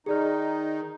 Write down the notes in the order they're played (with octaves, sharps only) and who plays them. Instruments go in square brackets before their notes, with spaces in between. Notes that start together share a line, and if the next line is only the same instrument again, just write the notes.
[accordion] D#3 D#4 [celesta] G#4 D5 F6